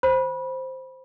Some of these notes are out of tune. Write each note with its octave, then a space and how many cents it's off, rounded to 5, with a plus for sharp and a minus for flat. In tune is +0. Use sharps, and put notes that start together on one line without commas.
C5 +0 B5 -20